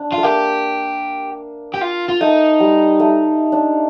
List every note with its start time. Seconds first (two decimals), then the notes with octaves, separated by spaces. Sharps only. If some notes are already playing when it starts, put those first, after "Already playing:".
Already playing: D4
0.12 F4
0.18 A3
0.23 A#3 G4
1.74 G4
1.81 F4
2.08 F4
2.21 A3 D#4
2.60 G3
3.00 A3
3.52 D4